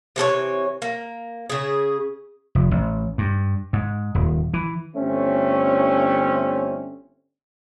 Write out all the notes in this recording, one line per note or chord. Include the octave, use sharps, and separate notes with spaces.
C3 E3 A4 C#5
A#3
C#3 G#4
F1
A1
G2
G#2
D#1
E3
G1 A3 C4 C#4